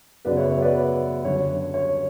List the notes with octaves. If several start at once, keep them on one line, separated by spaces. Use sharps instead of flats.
F#2 C#3 F#3 B3 B4 D5
C#5 E5
C#5 E5
B4 D5
F#2 D3 G3 C#5
C#5